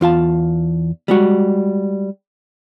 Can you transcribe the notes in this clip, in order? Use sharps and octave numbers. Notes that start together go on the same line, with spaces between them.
E2 F4 F5 A5
G3 G#3 F#4